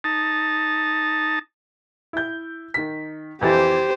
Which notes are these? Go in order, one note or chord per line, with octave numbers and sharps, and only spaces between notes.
D#4 A5
E4 G6
D#3 B6
F2 E3 G4 C5 A6